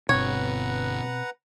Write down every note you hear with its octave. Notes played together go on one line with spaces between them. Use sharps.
D1 G1 B2 C4 B4 C#5 F#5 A#5